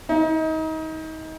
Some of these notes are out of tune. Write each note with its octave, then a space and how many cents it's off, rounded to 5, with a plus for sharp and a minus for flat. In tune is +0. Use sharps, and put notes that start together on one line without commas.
D#4 +30